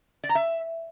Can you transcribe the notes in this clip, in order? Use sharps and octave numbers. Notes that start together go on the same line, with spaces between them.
D5
A#5
E5